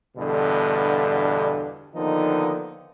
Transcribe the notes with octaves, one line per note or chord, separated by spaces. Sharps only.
E2 G2 B2 D3
D3 D#3 F3 A#3 B3 D#4